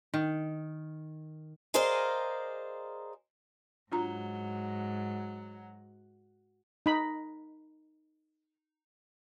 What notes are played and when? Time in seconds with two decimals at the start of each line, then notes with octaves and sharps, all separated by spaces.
0.14 D#3
1.74 G#4 A#4 C5 D5 D#5 F5
3.92 G#2 F#3 D4 F4 A#5
6.86 D#4 B5